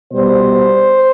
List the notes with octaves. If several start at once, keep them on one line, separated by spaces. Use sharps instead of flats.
B2 G3 B3 C5